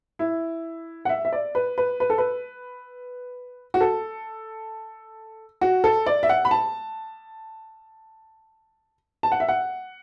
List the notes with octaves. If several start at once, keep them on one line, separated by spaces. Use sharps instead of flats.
E4
F#5
E5
E5
D5
B4
B4
B4
A4
B4
F#4
A4
F#4
A4
D5
E5
F#5
B5
A5
A5
F#5
E5
F#5